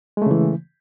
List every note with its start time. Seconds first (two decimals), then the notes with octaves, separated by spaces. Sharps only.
0.17 G#3
0.22 A3
0.26 C#3
0.31 E3